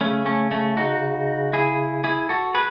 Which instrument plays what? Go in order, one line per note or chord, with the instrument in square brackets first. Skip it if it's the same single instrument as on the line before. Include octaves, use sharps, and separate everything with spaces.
[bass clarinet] C#3 [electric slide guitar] A3 C#4
[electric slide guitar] A3 C#4
A3 C#4
D#4 F#4
E4 G#4
E4 G#4
F#4 A4
G#4 B4